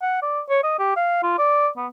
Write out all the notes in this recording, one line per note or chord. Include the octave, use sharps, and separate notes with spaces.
F#5
D5
C#5
D#5
G4
F5
F4
D5
B3